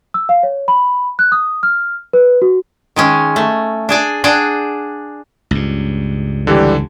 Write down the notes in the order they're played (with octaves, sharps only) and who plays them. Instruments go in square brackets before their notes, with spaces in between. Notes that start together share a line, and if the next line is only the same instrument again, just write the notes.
[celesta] E6
F5
C#5
B5
F#6
D#6
F6
B4
F#4
[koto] D#3 G#3 C#4
A3
D4 G#4 D5
D4 G#4 D5 F#5 G5
[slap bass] C#2 G2
[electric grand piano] D3 E3 G4 [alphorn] G3